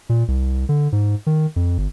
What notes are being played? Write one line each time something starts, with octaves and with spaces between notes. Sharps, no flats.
A#2
C2
D3
G#2
D#3
F2
G1